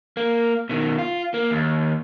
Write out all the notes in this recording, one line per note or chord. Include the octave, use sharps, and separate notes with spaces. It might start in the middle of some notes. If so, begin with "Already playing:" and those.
A#3
B2 D#3
F4
A#3
D#2